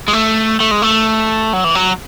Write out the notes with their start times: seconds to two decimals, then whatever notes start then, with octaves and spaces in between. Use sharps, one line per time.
0.08 G#3
0.13 A3
0.60 A3
0.71 G#3
0.82 A3
1.53 F#3
1.64 E3
1.75 F#3